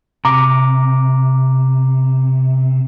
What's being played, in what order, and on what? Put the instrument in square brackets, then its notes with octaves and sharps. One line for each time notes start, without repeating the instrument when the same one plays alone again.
[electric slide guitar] C3 [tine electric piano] A#5 D6